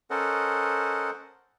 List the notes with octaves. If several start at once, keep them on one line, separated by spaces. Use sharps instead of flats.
C#4 A4 A#4 C5 D#5 F#5